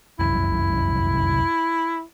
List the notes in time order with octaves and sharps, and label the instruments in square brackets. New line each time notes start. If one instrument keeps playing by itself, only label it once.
[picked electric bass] F1 C2 F#2 [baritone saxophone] E4